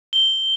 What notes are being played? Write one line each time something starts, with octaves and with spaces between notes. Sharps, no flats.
G7